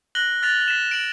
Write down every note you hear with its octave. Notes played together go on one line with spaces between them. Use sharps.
F#6 A#6 F#7 G7
F6 F#6 A6 B6 F7
B6 E7
D7 F#7